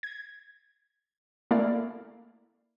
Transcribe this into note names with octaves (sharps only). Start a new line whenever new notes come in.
G#6
A3 A#3 E4 D5 F5